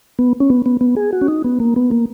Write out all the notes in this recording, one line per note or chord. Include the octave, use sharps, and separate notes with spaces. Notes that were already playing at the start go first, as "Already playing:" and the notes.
B3
C#4
B3
B3
B3
G#4
F#4
C#4
D#4
B3
A#3
B3
A#3